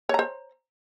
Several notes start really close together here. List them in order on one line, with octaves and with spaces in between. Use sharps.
C#5 A#5 C5